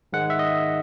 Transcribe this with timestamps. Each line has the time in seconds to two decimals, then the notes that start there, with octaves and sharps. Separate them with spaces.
0.13 G#2 D#3 G#3 F#5
0.30 E5
0.39 D#5